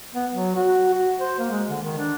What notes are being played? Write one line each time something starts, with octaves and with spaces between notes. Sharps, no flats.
B3
F#3
F#4
F#4
C5
A#3
G#3
D3
D#3
D4